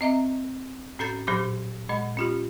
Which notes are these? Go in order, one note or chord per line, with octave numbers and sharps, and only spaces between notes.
C4 D#5 E5 A#5
A2 C#4 A4 A#5 G6 A6
A#2 F#3 G4 C5 C6 D6
A#2 G#3 D#5
C#4 F4 G4